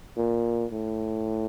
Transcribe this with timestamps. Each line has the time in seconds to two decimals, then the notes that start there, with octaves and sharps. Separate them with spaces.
0.17 A#2
0.71 A2